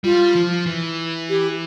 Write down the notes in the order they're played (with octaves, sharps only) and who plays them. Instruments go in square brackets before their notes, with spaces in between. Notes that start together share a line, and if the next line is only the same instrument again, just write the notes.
[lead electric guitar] G3 [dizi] F4
[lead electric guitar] F3
E3
[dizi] G4